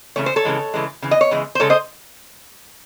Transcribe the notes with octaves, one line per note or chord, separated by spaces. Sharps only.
C#3 E3 A3 C#5
C5
A4 C#5
C#3 E3 G#3
C#3 E3 G#3
C#3 E3
D#5
C#5
C#3 E3 G#3
C5
C#3 G#3 A4 C#5
C5 D#5